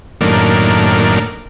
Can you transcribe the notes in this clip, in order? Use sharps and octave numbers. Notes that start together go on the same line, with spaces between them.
F#2 A2 D#3 A#3 D4